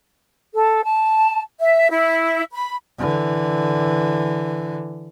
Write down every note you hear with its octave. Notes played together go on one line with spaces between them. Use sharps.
A4
A5
E5
E4
B5
D3 E3